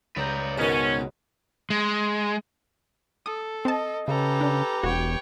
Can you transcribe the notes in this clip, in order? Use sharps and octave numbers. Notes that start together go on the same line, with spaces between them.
C#2 B4 D5 A#5 G6
G#2 B2 D#3 C#4 F#4 B4 D#5
G#3
A4 D#6
C4 D#5 A5
C#3 G4 A4 B4 A#5
D4
E1 F#4 C#5 G5